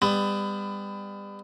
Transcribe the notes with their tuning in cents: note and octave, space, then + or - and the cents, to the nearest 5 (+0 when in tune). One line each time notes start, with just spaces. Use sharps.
G3 +35 B3 +25